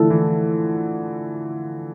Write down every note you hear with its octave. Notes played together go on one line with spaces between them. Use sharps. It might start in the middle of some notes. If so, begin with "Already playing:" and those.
Already playing: D3 E3 F3 A3 E4 A4
E3